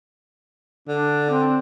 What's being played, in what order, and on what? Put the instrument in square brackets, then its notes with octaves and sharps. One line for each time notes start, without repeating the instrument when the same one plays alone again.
[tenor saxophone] D3 [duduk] D4
[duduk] C4